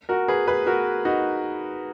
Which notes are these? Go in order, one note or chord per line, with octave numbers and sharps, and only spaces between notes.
F#4 A#4
G#4 B4
G#4 B4
F#4 A#4
D#4 F#4